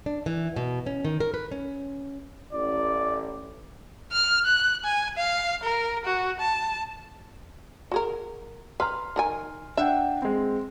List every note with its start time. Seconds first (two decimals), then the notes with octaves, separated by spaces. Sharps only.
0.06 D4
0.26 E3
0.56 B2
0.86 C#4
1.05 D#3
1.20 A#4
1.34 B4
1.51 C#4
2.53 A1 D5
4.12 F6
4.45 F#6
4.84 G#5
5.17 F5
5.63 A#4
6.05 F#4
6.40 A5
7.92 F#4 G#4 A#4
8.80 B4 A#5 C6 F6
9.16 D#3 A#4 G#5
9.77 D4 E5 F#5 G5
10.22 G#3 C4